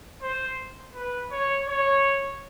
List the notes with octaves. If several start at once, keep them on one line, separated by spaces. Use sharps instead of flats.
C5
B4
C#5
C#5